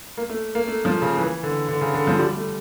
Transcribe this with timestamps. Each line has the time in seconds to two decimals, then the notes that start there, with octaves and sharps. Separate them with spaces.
0.17 A#3
0.30 A3
0.55 A#3
0.68 A3
0.85 F3
1.02 C#3
1.18 E3
1.43 D3
1.68 D3
1.81 C#3
1.94 D3
2.07 F3
2.19 G3
2.36 A3